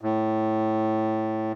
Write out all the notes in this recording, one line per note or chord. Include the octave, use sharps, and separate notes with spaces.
A2